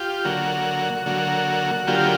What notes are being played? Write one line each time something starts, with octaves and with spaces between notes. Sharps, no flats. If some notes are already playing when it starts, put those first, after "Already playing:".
Already playing: F4 G4
D3 F#3 A#3 F#4
D3 F#3 A#3 F#4
D3 F#3 A#3 F4 G4